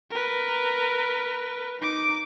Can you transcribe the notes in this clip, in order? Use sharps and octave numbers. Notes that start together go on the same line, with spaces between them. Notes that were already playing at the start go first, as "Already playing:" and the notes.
A#4 B4
D#4 D6